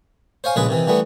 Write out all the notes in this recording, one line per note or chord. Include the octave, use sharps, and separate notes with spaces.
C5 C#5 F5 G#5
A#1 C#3 G#3 G#4 B4
C3 D#3 E3
E3 G3 A3 B3